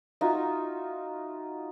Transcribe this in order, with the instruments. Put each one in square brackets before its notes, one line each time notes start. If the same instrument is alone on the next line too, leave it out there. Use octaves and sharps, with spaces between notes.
[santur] D#4 F4 F#4 E5